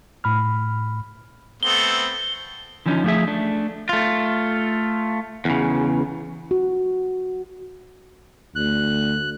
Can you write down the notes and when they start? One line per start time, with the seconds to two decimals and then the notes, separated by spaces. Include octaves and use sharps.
0.24 A2 B5 F6
1.63 A3 B3 C4 G7
2.86 D3 E3 F3 C#4 D#4
3.04 F3 A3 C#4 G#4 E5
3.27 A3 D4
3.89 A3 F4
5.45 E2 C#3
6.51 F#4
8.56 D2 F#6